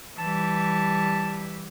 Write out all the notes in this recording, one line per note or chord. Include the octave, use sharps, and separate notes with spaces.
E3 G3 A5